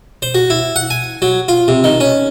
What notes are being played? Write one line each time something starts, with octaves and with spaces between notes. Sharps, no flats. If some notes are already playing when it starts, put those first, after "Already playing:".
C5
F#4
E4
F#5
G#5
F#3
F4
C3
D#3
C#4